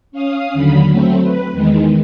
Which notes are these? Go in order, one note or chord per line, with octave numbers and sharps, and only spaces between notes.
C#4 F5 D#6
D#2 D3 F#3 B5
F#3 A3 C4
B4
E2 D#3 G#3